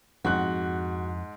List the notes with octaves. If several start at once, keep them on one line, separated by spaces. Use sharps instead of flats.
F2 G#2 E4 F#4 F#6